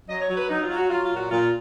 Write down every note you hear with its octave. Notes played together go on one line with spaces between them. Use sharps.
F#3 D#5
C#5
F#3
B4
F#3 D#4
F4
F#3
F#4
F#3 F4
F4
A#2
F#4
A#2 F4